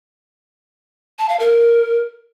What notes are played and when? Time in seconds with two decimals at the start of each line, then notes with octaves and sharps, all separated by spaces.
1.19 A5
1.29 F5
1.39 A#4